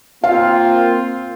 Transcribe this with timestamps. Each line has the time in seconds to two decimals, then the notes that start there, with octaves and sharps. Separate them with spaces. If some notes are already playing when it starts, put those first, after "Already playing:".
0.24 A#3 C4 F4 F5